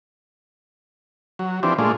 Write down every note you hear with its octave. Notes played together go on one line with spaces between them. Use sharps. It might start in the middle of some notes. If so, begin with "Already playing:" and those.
F#3
E3 F3 C4 D4 G4
A#2 G#3 A3 D4 F4